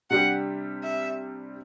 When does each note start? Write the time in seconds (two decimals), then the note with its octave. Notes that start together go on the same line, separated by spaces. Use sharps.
0.10 C3 G3 D4 G4 F#5
0.84 E5